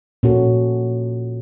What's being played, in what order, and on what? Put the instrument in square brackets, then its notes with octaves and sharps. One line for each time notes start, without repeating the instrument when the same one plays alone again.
[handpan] A#2 C#4 F#4 A4